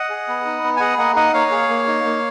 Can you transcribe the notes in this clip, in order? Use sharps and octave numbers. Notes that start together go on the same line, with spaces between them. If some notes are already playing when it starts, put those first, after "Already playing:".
Already playing: D#5 F#5
G#4
B3
D#4
B3
G#5
G#4 D#5 F#5
A#3 D#5 F#5
D#4 D#5 F#5
A#3 C#5 F5
G#4
A#3
D#4
A#3